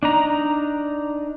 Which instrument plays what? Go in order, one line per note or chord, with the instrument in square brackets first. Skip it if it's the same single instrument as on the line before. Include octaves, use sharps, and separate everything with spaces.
[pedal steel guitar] D4 D#4 A#5